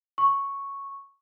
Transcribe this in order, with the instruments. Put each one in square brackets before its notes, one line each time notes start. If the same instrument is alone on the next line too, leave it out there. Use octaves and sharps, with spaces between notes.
[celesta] C#6